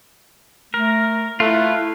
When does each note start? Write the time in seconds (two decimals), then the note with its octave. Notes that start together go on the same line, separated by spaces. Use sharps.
0.74 A3 A#4
1.40 A3 E4 F4 B4